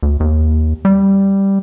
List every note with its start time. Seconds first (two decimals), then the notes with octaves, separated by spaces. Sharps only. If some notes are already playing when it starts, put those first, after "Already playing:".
0.03 D2
0.20 D#2
0.85 G3